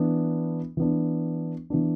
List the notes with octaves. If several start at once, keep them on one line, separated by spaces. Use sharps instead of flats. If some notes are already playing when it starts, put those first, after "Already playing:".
Already playing: E3 B3 D4
E3 B3 D4
E3 B3 D4